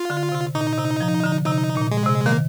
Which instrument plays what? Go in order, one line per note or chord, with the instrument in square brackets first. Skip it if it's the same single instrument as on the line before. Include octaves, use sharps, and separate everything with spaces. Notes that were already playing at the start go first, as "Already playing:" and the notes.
Already playing: [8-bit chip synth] F4
[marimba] D3
C3
[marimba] A#2 [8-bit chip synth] D#4
[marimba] C3
F3
D3
[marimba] C3 [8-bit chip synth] D#4
[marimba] A#2
[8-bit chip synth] G#3
[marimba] C3
[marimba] D#3 [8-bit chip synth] A#3